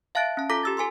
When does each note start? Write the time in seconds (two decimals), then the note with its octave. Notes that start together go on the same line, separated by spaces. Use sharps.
0.15 E5 F5 A5 F#6 A6 D7
0.37 C#4 A5
0.50 F4 A4 A#5 D6 A#6 B6
0.63 G4 E6 A6
0.77 A4 G#5 C6 E6